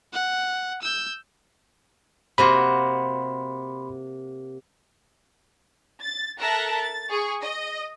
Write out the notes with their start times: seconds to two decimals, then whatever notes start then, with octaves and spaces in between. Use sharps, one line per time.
0.13 F#5
0.82 E6 G6
2.38 C3 A#3 F#4 B5 C6
6.01 A6
6.38 A4 A#4 E5 A5 F#6 A#6
6.82 A6
7.10 G#4 C#6
7.42 D#5